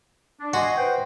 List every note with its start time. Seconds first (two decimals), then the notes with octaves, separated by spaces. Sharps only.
0.41 D4
0.54 F#4 D#5 G#5 C6
0.77 B4 C5 G5